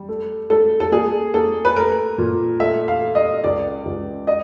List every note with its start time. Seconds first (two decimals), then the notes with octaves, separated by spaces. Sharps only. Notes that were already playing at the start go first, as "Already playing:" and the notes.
Already playing: G3
0.09 A3
0.50 A3 A4
0.80 A4
0.92 A#3 G#4
1.34 A#3 A4
1.65 B4
1.76 A3 A#4
2.18 A#2
2.60 A3 E5
2.88 F5
3.01 A3
3.15 D#5
3.44 C#2 D5
3.85 C#2
4.27 D#5